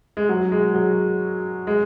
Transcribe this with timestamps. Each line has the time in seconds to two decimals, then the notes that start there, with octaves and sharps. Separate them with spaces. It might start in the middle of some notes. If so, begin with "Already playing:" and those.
0.17 G#3
0.29 F#3
0.52 G#3
0.74 F#3
1.67 G#3